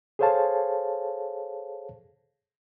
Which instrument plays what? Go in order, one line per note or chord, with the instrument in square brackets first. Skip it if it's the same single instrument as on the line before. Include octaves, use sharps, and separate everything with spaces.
[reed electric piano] G#4 A4 C5 C#5 F5 A5